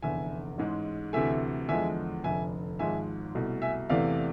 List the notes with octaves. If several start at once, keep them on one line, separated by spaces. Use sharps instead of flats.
F1 E2 D3 E5 G#5
A1 G#2 G#3
D2 C3 E3 A3 E5 G#5
E2 D3 F3 G#3 E5 G#5
F1 F2 D3 E5 G#5
G#1 G#2 F3 G#3 E5 G#5
C2 B2 A3
E5 G#5
E2 C3 E3 A3 D5 F5